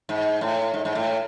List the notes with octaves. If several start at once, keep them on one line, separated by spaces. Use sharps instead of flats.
G#2
A2
G#2
G#2
A2